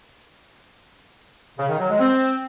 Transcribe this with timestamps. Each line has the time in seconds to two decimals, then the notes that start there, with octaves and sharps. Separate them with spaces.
1.58 C#3
1.68 D#3
1.79 F#3
1.89 G#3
1.99 C4